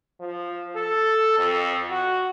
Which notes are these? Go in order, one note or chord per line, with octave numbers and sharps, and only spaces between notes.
F3
A4
F2
F#4